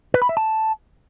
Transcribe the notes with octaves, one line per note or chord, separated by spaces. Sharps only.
B4
B5
E5
A5